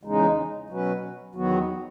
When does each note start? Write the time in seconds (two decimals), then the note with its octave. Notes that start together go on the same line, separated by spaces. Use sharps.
0.03 E2 C#3 G#3 D#4
0.70 B2 F#3 C#4 F#4 B4
1.35 E2 D#3 F#3 B3 F#4